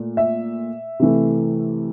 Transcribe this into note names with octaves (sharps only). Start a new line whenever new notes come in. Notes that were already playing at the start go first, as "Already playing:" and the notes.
Already playing: A#2 A3
E5
C3 E3 A3